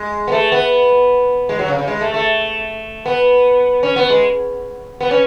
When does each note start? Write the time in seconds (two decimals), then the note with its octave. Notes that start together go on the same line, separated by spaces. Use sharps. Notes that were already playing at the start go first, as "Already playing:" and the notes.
Already playing: G#3
0.28 B3
0.32 A3
0.52 B3
1.49 G#3
1.59 F#3
1.68 C#3
1.79 C#3
1.88 G#3
2.01 A3
2.14 A3
3.06 B3
3.83 C#4
3.96 B3
4.10 G#3
5.01 B3
5.11 C#4